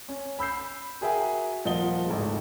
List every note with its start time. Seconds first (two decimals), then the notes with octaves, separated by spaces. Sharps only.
0.09 C#4
0.39 B5 E6 G6 C7
1.01 F#4 G#4 A#4 E5 G5 G#5
1.65 D#1 F3 A#3 D#5 F#5 G7
2.07 G#1 A2 C#3